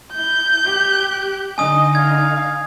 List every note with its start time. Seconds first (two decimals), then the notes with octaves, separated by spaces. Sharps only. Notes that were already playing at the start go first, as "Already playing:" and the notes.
0.14 E4 G6
0.65 G4
1.58 D3 D#4 D#5 G#5 D#6
1.95 F5 G#6